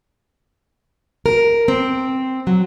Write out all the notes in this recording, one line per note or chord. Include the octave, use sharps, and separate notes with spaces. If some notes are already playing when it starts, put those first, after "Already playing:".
A#4
C4
F#3